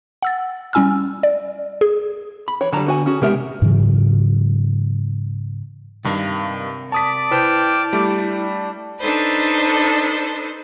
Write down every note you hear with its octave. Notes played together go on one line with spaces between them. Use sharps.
F#5 E6 A6
G3 C#4 E4 G#5 E6 F6
D5
G#4
B5
E3 C#5
D3 F#3 G3 A5 A#5
B3 F#4 G#5
C#4 F#4 G#4
C3 G#3 B3 G4 A#4 E5
G#2 C#3 E3 F#3
G2 C3 D#3 A#4 F5
D5 A5 D#6 B6
E4 B4 C5 G5 A5 F6
G3 A3 D4
D4 D#4 A4 B4 C5